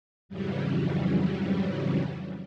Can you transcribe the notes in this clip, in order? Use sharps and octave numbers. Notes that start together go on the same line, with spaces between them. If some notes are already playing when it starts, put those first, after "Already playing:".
F2 G#2 C#3 E3 F#3 G3